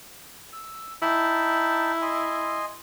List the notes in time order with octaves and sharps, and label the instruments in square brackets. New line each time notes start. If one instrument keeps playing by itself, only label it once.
[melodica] E6
[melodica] D#4 G5 A5 [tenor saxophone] E4
[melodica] D#5 G#5 C6